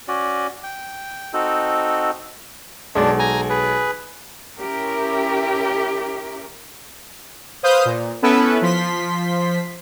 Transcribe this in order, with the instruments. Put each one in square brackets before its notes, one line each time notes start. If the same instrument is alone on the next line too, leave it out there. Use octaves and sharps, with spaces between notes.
[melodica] C#4 F#4 D5
G5
C4 D#4 F#4 A4
[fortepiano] B1 G#3 [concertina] D4
[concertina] G#5 A#5
G#4 B4
[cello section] C#4 E4 G4 A#4
[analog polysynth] B4 C5 F5 D#6 F6 G6
A#2
B3 C#4 E4 A4 B4 E5
F3 C6 B6